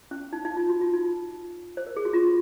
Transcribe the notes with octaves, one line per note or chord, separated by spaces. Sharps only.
C#4
D#4
D#4
F4
F#4
F4
D#4
C5
A#4
G#4
F#4
F4